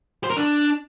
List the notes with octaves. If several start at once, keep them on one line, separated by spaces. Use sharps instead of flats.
C5
A#4
D4